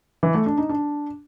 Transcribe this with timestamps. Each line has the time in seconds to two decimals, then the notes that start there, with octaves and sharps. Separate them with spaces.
0.23 E3
0.34 A3
0.46 D4
0.58 D#4
0.69 D4